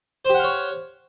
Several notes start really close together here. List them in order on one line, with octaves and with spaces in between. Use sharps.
C5 G4 F#5 F5 C#5